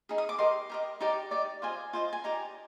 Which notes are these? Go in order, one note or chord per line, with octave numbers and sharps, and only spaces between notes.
D#4 G#4
D#6
D6
G4 A#4 D#5 C6
G4 A#4 D#5
D#4 G4 D5 A#5
D#4 G4 D5
F4 C5 D#5 G#5
F4 C5 D#5
G#5
D#4 G4 D5 A#5